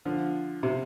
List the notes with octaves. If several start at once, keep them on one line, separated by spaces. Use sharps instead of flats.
D3 F3
C3